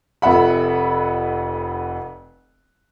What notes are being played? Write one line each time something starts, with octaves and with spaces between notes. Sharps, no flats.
F1 F2 E5 F#5 B5